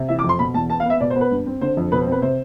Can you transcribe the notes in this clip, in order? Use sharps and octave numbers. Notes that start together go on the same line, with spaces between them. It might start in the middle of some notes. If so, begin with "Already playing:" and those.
Already playing: C3
E3 E5
D6
F2
C6
B2 B5
E2 A5
B3 A5
F5
B3 E5
B2 D5
C5
B3
B4
G2
C4
D3 C5
F2
B2 B4
C5
C4 B4
C3 C5